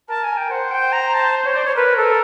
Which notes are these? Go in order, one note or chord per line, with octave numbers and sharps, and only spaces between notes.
A#4 A5
G#5
G5
C5 F#5
G5
A#5
A5
C#5
D5
C#5
A#4 B4
A4